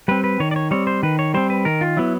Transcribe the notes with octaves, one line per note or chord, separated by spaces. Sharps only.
G3 C4 B4
B4
D#3 C#5
D5
C#5
G3 C4 C#5
C5
D#3 B4
C#5
G3 C4 C5
B4
D#3 A#4
F4
F#3 B3 E4